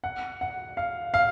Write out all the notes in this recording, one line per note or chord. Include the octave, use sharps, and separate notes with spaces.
F#5
F#5
F5
F5